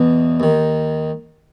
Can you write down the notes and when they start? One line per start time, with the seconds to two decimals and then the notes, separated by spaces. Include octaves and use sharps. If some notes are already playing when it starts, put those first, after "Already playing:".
Already playing: E2 B2
0.40 D#2 D#3